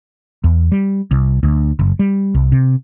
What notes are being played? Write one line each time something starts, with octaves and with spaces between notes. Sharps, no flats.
E2
G3
C2
D2
F#1
G3
C2
C3